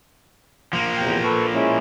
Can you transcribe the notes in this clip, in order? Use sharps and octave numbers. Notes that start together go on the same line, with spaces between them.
F3 A#3
E2 C3 G5
A4 B4 C#6
G#3 C#4 E4